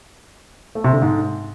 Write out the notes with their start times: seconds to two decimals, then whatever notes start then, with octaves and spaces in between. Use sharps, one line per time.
0.75 A3
0.84 C3
0.93 D3
1.02 G#2